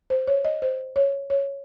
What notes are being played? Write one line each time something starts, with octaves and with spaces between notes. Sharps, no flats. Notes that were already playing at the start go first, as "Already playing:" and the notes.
C5
C#5
D#5
C5
C#5
C#5